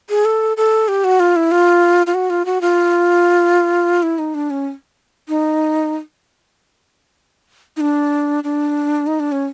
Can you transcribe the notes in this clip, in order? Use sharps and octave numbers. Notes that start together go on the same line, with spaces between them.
G#4
A4
A4
G4
F#4
F4
E4
F4
F4
F#4
F4
F#4
F4
E4
D#4
D4
C#4
D#4
D#4
D4
D4
D#4
D4
C#4